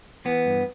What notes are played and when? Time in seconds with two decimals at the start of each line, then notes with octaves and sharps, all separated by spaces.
0.25 E3 B3
0.46 G2